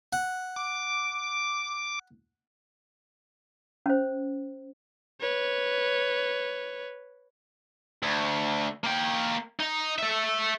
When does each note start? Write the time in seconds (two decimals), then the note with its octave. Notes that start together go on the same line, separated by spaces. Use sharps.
0.13 F#5
0.56 D6
3.86 C#4 C5
5.20 B4 C#5
8.03 D2
8.84 A#3 G5
9.60 D#4
9.98 A4 E5